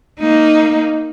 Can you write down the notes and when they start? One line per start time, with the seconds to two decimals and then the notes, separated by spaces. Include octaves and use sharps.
0.19 A#3 D#4